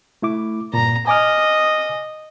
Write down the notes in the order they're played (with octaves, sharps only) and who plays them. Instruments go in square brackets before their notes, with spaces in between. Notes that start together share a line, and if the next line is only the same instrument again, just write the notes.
[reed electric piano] A3 E4 D6
[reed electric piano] G2 A#2 [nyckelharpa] A#5
[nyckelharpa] D#5 [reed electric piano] G#5 D6 F6